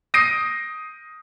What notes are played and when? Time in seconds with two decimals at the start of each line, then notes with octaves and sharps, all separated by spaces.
0.14 D#6 G6 A#6 C7 D7 D#7